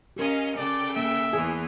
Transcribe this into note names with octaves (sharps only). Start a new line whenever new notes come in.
C#4 G4 A#4 D#5 F5
C#3 A4 D5 G5
A#3 E5
E2 E3 G#4